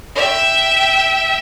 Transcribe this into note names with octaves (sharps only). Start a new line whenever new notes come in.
E5 G5